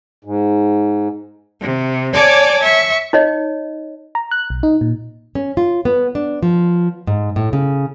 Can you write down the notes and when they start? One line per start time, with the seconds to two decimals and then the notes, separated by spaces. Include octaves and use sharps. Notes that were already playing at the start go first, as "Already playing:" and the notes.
0.24 G#2
1.61 C3
2.14 C#5 D5 G#5 A5 D6
2.62 E5 C#6
3.13 D#4 C#5 D#5
4.15 A#5
4.31 F#6
4.50 B1
4.63 D#4
4.81 A#2
5.35 C#4
5.57 F4
5.85 B3
6.15 D4
6.43 F3
7.07 G#2
7.36 A2
7.53 C#3